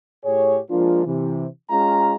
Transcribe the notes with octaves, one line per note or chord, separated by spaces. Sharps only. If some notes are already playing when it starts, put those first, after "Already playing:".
A2 G4 G#4 C#5
F3 G#3 A#3 D4 F4
C3 E3
G#3 C#4 F4 A#5